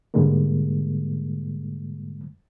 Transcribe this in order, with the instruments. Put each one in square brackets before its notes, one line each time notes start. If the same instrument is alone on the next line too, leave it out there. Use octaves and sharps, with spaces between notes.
[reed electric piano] G#2 B2 D3 G3 G#3 A#3